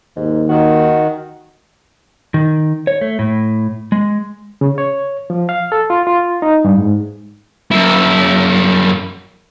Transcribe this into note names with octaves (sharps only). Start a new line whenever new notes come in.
D#2 G#2
D#3 F#4
D#3
C#5
A3
A2
G#3
C#3
C#5
F3
F5
A4
F4
F4
D#4
G2
G#2
F#2 E4